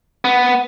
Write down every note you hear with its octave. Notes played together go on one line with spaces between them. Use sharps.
B3